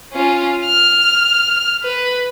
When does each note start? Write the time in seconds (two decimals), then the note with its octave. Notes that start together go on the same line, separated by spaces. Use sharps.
0.13 C#4 F4
0.65 F6
1.84 B4